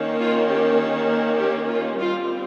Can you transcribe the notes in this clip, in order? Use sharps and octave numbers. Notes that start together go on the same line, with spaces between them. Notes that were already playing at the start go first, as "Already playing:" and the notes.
Already playing: D#3 A#3 C#4
F4
G4
A#4
G4
F4
G3 C4 F4